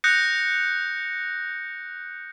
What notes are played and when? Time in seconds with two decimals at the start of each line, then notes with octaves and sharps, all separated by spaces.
0.04 D#6 F#6 G6 A#6 C#7